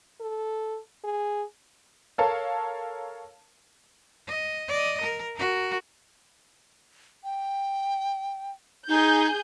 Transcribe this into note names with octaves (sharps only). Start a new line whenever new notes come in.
A4
G#4
A4 A#4 C#5 F5 A5
D#5
D5 D#5
A#4
F#4 A#4
G5
D#4 G#4 G6